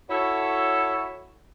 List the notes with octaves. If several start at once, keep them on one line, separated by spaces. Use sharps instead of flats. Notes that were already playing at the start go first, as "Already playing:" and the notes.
E4 F#4 A4 C#5